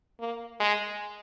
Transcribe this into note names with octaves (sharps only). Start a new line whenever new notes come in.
A#3
G#3